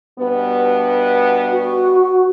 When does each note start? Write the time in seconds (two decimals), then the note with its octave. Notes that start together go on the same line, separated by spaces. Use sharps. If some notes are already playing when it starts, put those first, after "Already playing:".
0.18 G2 B2 B3
1.51 F#4